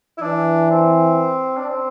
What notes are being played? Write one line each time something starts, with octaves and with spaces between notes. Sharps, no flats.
E4
E3 D4
C4
D4
C4